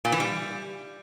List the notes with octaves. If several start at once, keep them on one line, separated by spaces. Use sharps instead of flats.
A#2
E3
G3